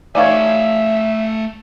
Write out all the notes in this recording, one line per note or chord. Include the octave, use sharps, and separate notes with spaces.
A3 D#4 C#5 D5 E5 F5 G#5